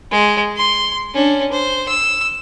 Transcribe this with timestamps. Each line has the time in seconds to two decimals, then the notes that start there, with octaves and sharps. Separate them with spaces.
0.11 G#3
0.57 C6
1.14 C#4 D4
1.52 C5
1.88 E6